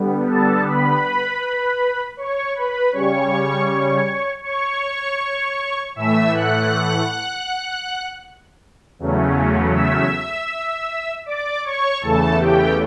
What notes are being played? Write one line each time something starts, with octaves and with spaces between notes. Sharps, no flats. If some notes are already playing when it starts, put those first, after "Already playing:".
Already playing: D3 G3 B3
A4 A5
B4 B5
C#5 C#6
B4 B5
C#3 G3 C#4 C#5 C#6
C#5 C#6
A2 E3 A3 E5 E6
F#5 F#6
E2 C#3 F#3 A3 C#4
E5 E6
D5 D6
C#5 C#6
E2 C#3 E3 A3 A4 A5
G4 G5